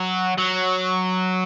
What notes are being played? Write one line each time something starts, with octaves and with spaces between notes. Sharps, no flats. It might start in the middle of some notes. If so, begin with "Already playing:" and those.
Already playing: F#3
F#3